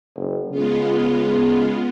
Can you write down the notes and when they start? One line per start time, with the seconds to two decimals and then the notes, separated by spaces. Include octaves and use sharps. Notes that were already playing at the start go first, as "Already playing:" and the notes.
0.16 F#1
0.51 C#3 G#3 B3 F4